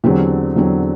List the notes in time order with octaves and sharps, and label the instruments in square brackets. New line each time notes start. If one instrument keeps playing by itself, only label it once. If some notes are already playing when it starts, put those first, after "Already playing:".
[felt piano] E2 D3 F#3 C4 G4
E2 D3 F#3 C4